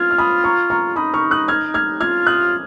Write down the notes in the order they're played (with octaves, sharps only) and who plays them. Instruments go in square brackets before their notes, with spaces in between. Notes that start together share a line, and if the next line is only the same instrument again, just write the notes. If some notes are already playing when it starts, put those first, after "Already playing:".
Already playing: [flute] F4 [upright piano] F6 G#6
[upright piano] F6
B5 D#6
A#5 C#6
A#5 C#6
[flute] D#4 [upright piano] B5 D#6
[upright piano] C#6 F6
D#6 F#6
F6 G#6
F6 G#6
[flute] F4 [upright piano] F6 G#6
[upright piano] D#6 F#6